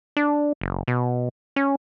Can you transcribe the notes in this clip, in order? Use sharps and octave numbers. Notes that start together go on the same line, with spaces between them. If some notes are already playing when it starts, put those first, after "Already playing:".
D4
F#1
B2
C#4